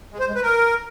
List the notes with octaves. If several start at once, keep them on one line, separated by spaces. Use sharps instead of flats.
G#3
C5
G#3
B4
A#4